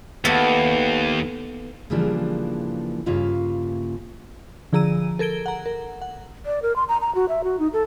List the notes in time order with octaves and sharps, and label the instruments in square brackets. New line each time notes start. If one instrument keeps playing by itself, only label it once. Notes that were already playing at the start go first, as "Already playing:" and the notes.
[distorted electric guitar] D#2 [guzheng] A3 B3 A4
[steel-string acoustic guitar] C#3 E3 F3 G3 A#3 D4
G2 C#3 A#3 C#4 F4 E5
[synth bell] D3 F3 G#4 A#5 E6 D#7
A4 A#4 G#6 D7 G7
F#5 A#5
A#4
F#5
[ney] D5
A#4
C6
A#5
A#5
F#4
E5
F#4
D#4
A4